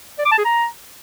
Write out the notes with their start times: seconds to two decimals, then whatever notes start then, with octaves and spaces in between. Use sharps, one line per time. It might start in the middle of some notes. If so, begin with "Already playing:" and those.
0.18 D5
0.25 D6
0.32 A5
0.38 G#4
0.45 A#5